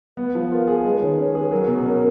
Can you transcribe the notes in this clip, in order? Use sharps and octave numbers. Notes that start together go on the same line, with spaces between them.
B3 B4
F3
F4 A#4
G#4
G#3 B4
D#3 C#5
C#4 B4
G#4 B4
F#3 A#4
B2
C#4